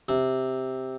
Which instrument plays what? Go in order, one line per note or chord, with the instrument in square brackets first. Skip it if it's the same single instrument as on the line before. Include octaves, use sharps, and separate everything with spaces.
[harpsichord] C3